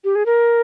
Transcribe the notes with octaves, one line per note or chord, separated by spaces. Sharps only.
G4
G#4
A#4